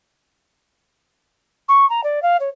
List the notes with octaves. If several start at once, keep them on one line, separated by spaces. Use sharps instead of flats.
C#6
A#5
D5
F5
C#5